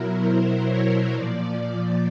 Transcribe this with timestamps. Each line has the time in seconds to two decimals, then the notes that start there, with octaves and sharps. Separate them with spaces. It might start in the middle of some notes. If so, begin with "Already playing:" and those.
Already playing: B2 F#3 E4 A#4
0.18 C5
0.65 C#5
1.12 A#2 F3 D5